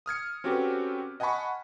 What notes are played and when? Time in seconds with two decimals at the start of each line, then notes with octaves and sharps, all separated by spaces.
0.06 D#6 F6 G#6 C#7
0.44 C4 C#4 F#4 G4 A4 B4
1.20 D#5 F#5 G#5 A5 B5 C#6